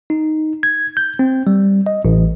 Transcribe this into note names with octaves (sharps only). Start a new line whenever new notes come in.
D#4
G#6
G6
C4
G3
D#5
A1